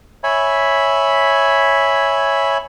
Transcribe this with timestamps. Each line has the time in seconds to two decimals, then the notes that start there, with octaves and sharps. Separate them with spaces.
0.24 C#5 E5 G#5 B5